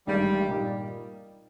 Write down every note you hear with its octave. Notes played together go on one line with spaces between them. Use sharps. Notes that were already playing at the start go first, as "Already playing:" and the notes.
A1 G2 D#3 G3 G#3
A#2 G3 A#3 D#4 G4